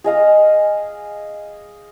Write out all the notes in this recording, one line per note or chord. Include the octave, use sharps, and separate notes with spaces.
G#4 D#5 F5 D#6